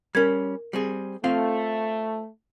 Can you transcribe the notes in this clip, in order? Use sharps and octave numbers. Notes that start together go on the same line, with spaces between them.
G3 C#4 A#4 G#6
G3 C4 G#4
A3 C4 F4 F5